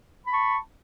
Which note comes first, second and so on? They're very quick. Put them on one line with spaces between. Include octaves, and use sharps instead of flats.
B5 A5 C#6